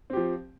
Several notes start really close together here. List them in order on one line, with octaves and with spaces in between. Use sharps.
C4 G4 F3